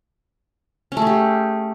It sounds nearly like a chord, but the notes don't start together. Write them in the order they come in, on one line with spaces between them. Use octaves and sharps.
C#4 A3 G#4 G4